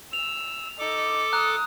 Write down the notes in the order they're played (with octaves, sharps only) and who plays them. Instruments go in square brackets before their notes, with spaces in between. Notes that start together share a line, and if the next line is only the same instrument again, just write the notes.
[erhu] E6 [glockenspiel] F7
[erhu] D#4 [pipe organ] A4 D6
[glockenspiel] A#5 F#6 [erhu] D#6